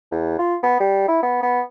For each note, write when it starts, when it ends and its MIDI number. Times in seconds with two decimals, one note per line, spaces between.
0.12 0.38 40
0.39 0.55 65
0.63 0.77 59
0.80 1.07 55
1.08 1.19 64
1.23 1.40 59
1.43 1.61 59